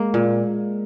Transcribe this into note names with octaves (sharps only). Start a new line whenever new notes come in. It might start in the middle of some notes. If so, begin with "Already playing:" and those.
Already playing: G#3 A#3
A#2